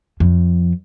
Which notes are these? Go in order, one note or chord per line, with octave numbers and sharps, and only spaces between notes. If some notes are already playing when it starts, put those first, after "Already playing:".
F2